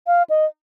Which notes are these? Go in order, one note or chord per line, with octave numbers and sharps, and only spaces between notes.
F5
D#5